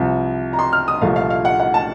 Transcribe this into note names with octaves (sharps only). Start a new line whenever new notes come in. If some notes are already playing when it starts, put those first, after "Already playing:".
Already playing: C2 C3 F3
A#5
C6
F6
D#6
C2 A#2 F3 A3 F5
F5
F5
F#5
F#5
A5